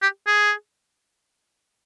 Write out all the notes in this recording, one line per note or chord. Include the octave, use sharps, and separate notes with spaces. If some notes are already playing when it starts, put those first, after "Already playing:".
G4
G#4